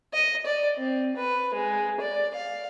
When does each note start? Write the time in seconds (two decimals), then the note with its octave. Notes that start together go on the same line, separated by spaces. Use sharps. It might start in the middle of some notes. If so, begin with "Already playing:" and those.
0.14 D#5
0.46 D5
0.78 C4
1.16 B4
1.54 G#3
2.00 D5
2.35 F5